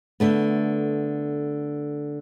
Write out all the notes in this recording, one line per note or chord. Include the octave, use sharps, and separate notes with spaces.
D3 A3 B3